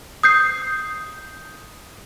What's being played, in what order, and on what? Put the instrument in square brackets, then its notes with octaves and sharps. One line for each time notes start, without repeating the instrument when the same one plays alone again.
[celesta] D#6 G6 C7